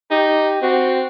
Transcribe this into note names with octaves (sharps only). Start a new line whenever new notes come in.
D#4 G4
C4 F#4